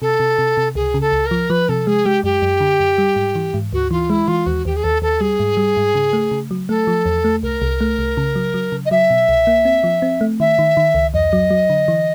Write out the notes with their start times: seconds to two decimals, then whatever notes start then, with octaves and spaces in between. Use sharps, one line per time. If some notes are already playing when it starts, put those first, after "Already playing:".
0.01 C3 A4
0.20 C3
0.39 C3
0.57 C3
0.75 C#2 G#4
0.94 C#3
1.00 A4
1.12 C#2
1.26 A#4
1.31 F3
1.50 F3 B4
1.68 C3 A4
1.87 G#3 G#4
2.05 G#3 G4
2.24 F#2 G4
2.42 F#2
2.60 D3
2.80 F#2
2.98 G3
3.16 G#2
3.36 E3
3.54 G#2
3.73 D2 F#4
3.91 E3 F4
4.09 G#3 E4
4.27 E3 F4
4.46 D#2 F#4
4.65 D#2 G4
4.76 G#4
4.83 D#2 A4
5.02 D#2 A4
5.20 G3 G#4
5.40 G#2
5.57 G3
5.77 G#2
5.95 C#3
6.13 A3
6.31 C#3
6.51 F#3
6.69 A3 A4
6.87 F3
7.06 E2
7.24 A3
7.42 C2 A#4
7.62 C2
7.81 A3
7.99 C2
8.17 C#3
8.36 F#3
8.54 F#3
8.72 C#3
8.85 D#5
8.91 F#3 E5
9.10 B2
9.29 C2
9.47 A#3
9.65 C4
9.84 F3
10.02 C4
10.21 A3
10.40 D#3 E5
10.59 D#3
10.77 D#3
10.95 C#2
11.13 F2 D#5
11.33 F#3
11.51 F#3
11.70 D3
11.88 E3